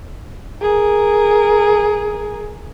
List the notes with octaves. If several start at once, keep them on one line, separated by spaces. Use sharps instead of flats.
G#4 A#4